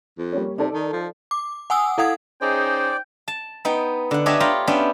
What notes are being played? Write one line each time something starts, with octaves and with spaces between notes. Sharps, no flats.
F2
G3 A#3 C#4
C3 D#4 A4 D5
D#3
F3
D6
F#5 G#5 D#6 E6
E4 A4 F5 F#5 D#6 G#6
C#4 D#4 G#4 C5 D5 G5
A5
B3 D#4 G5
D3 F#5
D4 G4 C#5 D#5 E5 G#5
F4 C#5 G5 A#5 B5
B3 C#4 D4 E5 G5